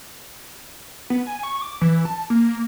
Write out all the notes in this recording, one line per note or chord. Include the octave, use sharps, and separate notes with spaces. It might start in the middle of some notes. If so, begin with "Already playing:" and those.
B3
G#5
C#6
D6
E3
A5
A#3
A#3